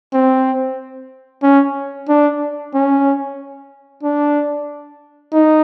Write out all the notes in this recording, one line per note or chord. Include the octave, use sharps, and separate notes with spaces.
C4
C#4
D4
C#4
D4
D#4